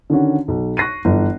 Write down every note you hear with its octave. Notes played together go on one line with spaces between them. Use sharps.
D3 D#3 C#4 F#4
B1
C#6 F#6 A#6 C7 D#7
G1 E3